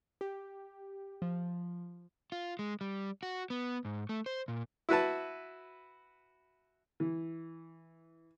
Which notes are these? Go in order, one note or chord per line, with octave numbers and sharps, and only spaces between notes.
G4
F3
F4
G#3
G3
F#4
B3
G#2
A3
C5
A#2
E4 F#4 B4 A5
E3